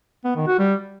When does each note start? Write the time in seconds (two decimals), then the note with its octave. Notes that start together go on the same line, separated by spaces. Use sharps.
0.24 B3
0.36 D#3
0.47 F#4
0.59 G3